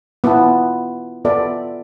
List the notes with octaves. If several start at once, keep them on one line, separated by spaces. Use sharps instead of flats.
B3 E4 F4 B4 A5
B3 F4 A4 D5 E5